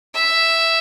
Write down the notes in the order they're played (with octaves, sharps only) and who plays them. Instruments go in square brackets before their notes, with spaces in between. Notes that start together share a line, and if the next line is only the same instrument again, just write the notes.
[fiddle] E5